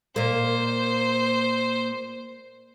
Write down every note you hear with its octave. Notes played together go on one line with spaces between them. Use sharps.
A#2 A#3 C5